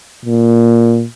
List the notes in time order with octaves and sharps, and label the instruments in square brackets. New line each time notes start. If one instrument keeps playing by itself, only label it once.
[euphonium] A#2